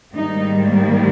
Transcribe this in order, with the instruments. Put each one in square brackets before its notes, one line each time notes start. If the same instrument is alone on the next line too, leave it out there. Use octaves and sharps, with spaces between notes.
[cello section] G#2 D#3 G3 A#3 D#4